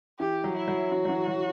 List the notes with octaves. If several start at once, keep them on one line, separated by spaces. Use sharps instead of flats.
E3 G4
F#3
E4
F#3
E3 F#4
F#3
E3
F#3